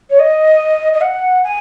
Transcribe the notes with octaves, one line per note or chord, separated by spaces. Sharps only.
C#5
D#5
D#5
F#5
G#5